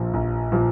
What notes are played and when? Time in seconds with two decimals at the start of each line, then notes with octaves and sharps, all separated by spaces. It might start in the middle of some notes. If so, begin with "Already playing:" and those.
Already playing: A#1 A#2 F3
0.13 A#1
0.52 A#2 F3